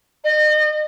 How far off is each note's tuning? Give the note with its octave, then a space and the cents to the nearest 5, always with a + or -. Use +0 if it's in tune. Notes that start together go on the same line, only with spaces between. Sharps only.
D#5 -35